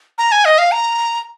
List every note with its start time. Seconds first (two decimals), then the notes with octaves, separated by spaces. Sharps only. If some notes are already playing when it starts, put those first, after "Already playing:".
0.18 A#5
0.32 G#5
0.45 D#5
0.58 F5
0.72 A#5